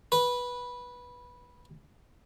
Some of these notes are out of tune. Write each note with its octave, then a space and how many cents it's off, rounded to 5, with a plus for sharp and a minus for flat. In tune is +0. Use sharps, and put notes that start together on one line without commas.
B4 -10